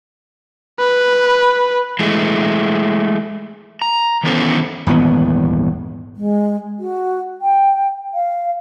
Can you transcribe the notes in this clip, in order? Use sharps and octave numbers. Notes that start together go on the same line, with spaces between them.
B4
E3 G#3 A3
A#5
D#3 E3 B3 C#4 A4 C5
D#1 G#1 E2 B3
G#3
F#4
G5
F5